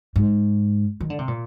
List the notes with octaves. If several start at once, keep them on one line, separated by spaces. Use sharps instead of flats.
G#2
D#3
D3
C3
A#2